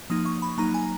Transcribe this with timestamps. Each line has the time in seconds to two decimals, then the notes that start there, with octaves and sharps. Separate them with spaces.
0.10 F3 A#3 D#4 D#6
0.26 C#6
0.42 B5
0.58 F#3 A#3 D#4 A#5
0.74 G#5